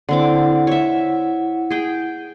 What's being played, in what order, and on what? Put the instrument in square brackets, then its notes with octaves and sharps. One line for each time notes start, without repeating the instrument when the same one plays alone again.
[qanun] D3 C4 D6 [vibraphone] E4 F#5
[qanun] C#5 E5
G#4 G5